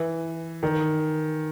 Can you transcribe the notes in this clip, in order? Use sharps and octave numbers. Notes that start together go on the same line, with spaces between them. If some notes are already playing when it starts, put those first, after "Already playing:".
Already playing: E3
D#3